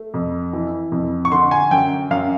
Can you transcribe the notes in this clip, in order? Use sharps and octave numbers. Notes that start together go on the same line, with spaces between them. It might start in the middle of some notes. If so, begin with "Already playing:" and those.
Already playing: A3
F2
E3
F2
C#6
D3 C6
G#5
F#2 G5
F#2 F5